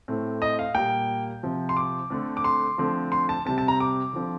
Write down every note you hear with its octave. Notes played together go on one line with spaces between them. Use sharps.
A2 A3 C4
D#5
F5
A#2 G3 A#3 G5
C3 F3 C4
C6
D6
D3 A3 C4
D6
C6
D3 F3 A3 C4
C6
A5
C3 G3 C4 A5
A5
A#5
D6
D3 F3 C4